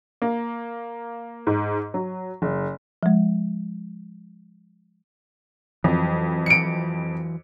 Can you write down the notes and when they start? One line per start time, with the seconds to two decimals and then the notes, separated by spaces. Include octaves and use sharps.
0.22 A#3
1.47 G#2
1.94 F#3
2.42 F#1
3.03 F3 G#3
5.84 F2 E3 F#3
6.46 C#7 D7